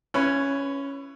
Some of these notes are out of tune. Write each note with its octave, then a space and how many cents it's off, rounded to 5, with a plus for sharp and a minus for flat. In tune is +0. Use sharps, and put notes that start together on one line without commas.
C#4 +0 E4 +35 B4 +0